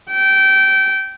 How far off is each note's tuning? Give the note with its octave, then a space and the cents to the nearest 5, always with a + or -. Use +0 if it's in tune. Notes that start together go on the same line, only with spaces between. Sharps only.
G5 -20